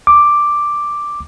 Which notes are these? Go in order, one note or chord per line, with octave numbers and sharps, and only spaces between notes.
D6